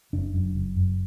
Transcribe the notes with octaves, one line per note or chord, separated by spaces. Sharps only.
F#1 D4
F#2
F#1
F#2